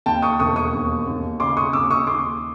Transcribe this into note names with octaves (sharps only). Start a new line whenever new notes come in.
D#2 G5 A5
C#6 D#6
E1 C#6 D#6
C#6 D#6
D#2
D#2
C#3 C6 D6
C#6 D#6
D#2 D6 E6
C#6 D#6
D#2 C6 D6